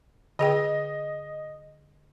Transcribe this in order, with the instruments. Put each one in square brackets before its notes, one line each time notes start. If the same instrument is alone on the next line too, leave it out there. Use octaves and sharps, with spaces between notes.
[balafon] D3 G#4 G5 [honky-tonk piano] D#5